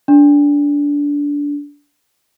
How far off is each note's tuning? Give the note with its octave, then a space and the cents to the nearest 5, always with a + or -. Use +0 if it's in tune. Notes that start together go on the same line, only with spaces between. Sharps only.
D4 -20